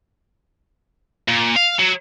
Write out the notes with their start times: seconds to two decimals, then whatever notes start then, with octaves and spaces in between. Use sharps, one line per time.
1.28 A#2
1.56 F5
1.79 F#3